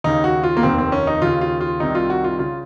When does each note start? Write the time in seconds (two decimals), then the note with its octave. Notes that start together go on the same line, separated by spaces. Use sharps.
0.04 D#2 C#3 D#4
0.24 F#4
0.43 F4
0.57 A#3
0.63 F1 D#2 D#3 C4
0.78 C4
0.92 C#4
1.07 D#4
1.22 D#2 C#3 F4
1.41 F4
1.61 F4
1.80 C2 C3 D#3 D#4
1.95 F4
2.10 F#4
2.24 F4
2.39 C#3 F4